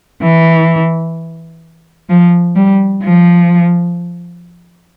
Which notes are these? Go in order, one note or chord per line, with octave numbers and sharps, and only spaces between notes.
E3
F3
G3
F3